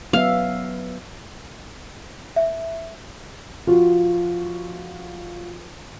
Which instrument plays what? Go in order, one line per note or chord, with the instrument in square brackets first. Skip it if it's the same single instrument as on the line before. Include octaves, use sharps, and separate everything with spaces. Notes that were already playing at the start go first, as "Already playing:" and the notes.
[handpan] F#3 B3 E5 [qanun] F5
[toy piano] E5
[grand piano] F3 F4 F#4